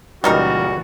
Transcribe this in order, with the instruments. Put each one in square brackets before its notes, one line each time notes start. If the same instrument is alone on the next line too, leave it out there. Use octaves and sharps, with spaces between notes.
[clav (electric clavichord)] C#2 G3 [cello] A#2 E3 [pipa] F#3 D#4 A#4 [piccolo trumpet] F#4